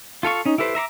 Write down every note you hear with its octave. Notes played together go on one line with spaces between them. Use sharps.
F4 A4 F5 C#6
C#4 D#4
E4 G4 A4 B4 C5
E5 A#5 C6 D6